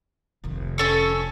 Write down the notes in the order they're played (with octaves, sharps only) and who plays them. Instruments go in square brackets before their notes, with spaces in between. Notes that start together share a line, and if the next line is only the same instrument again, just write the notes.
[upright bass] F1 D#3
[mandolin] C#4 A4 C#5